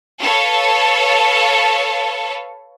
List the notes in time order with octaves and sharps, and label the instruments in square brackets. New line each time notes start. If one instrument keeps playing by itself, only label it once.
[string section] A4 B4 C#5 F5